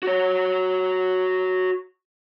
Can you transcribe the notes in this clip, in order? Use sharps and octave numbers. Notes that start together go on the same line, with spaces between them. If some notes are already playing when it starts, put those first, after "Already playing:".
F#4 C#5